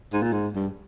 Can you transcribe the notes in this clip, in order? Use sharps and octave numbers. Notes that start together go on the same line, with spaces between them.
G#2
A#2
G#2
G2